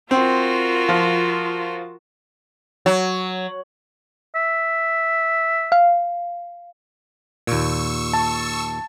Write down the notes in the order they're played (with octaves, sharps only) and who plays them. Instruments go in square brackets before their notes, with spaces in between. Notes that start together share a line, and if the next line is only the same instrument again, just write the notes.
[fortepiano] C4 [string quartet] F4 F#4 A#4
[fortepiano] F3
[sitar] F#3
[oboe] E5
[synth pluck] F5
[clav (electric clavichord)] D#2 A#2 [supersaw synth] C#6 E6
[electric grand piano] A5